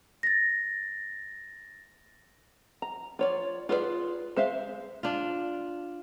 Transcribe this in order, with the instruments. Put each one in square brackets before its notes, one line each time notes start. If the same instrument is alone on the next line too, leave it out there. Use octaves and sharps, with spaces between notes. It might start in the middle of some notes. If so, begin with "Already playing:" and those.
[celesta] A6 A#6
[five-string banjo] A#5
F4 C#5 D5
F4 G#4 B4 C5 D5
G#3 C5 E5 F5
[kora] D4 F4